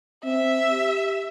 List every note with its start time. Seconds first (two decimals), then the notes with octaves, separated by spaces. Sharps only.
0.24 C4 E5
0.70 G4